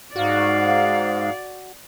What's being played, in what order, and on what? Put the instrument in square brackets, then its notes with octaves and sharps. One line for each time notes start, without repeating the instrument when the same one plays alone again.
[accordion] G#2 [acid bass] F#4 [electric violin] D5 [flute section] F5